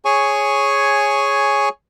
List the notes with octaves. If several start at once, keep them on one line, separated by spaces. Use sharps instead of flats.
G#4 C#5 G#5 C#6